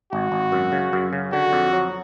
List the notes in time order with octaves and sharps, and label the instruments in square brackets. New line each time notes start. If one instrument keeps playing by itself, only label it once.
[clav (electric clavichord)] G#1 [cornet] F#4
[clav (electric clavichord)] G#1
F#2
C#3
F#2
C#3
[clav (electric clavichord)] D3 [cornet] F#4
[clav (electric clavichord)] F2
F#3